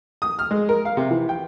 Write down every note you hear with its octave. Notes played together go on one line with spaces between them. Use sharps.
D#6
F6
G#3
A#4
F5
C3
E3
G5